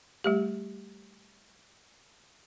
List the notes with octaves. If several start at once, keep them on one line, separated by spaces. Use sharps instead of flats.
G3 A3 G4